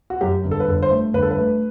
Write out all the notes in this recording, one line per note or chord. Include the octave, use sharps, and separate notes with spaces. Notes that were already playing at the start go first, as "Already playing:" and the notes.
F#4
F#2 G4
G1
A4
B4
G1 A4
C5
A3
G1 B4
A4
B4
A3